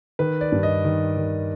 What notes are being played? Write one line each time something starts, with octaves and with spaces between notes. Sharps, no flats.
D#3 B4
D5
G2
D#5
D#3
D#3